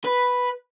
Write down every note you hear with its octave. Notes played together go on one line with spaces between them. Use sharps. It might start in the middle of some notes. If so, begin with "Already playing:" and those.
B4